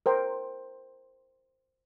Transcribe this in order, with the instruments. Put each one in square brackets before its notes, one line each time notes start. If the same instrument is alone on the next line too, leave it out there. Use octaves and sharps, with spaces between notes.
[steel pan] A#4 C5 G5